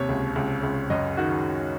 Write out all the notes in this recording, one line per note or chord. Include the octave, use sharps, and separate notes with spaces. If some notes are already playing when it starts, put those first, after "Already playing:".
Already playing: D#2 C3 C#5
C#2
C#2
C#2
F#2 D#5
D#3 F#4